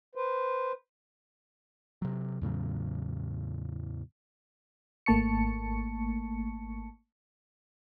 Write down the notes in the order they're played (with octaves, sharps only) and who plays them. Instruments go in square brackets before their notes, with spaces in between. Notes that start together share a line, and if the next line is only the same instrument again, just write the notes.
[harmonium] B4 C5
[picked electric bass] C3 F#3
E2 A2 C#3 F#3
[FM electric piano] G#1 A3 A#3 A5 C#6 C#7